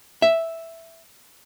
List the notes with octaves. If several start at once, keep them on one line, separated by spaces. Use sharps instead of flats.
E5